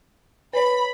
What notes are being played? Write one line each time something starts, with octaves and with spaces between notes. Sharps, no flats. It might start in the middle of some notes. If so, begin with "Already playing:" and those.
B4 C#5 B5